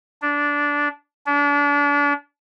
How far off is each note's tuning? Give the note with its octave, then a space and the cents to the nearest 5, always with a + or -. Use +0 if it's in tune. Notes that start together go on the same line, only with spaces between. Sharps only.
D4 -15
D4 -35